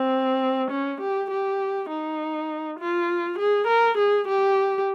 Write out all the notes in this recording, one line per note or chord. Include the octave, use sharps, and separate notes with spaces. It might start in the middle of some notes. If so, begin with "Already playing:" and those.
Already playing: C4
C#4
G4
G4
D#4
F4
G#4
A#4
G#4
G4